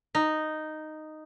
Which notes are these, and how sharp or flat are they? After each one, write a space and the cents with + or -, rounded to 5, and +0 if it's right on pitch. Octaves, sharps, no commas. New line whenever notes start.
D#4 -5